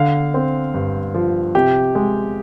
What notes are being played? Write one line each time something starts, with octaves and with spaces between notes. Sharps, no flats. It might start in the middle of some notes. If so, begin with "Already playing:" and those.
Already playing: D3 F5
C4
G2
F3
C3 G4
G#3